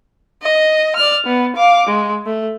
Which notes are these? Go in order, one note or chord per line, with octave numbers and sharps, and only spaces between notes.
D#5
D5 F6
B3
F5 D6
G#3
A3